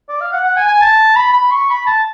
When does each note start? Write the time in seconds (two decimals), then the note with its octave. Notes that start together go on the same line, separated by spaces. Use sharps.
0.09 D5
0.20 F5
0.33 F#5
0.44 F#5
0.56 G#5
0.68 G#5
0.81 A5
1.16 B5
1.33 B5
1.51 C#6
1.70 B5
1.87 A5